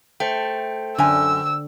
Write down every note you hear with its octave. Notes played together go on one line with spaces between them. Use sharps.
A3 C5 G5
F#2 D3 D4 G#5 E6